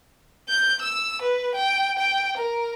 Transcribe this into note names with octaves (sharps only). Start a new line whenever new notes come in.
G6
E6
B4
G5
G5
A#4